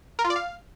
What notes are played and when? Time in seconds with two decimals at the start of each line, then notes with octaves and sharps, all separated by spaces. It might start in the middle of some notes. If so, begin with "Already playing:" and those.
0.19 A#4
0.24 F4
0.30 D5
0.36 F5